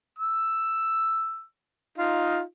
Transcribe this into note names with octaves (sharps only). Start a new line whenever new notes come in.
E6
D#4 F4